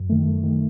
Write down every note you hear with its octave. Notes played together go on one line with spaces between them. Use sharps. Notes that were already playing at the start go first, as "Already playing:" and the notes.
Already playing: F#2
D#3 A3
F#2
D#3 A3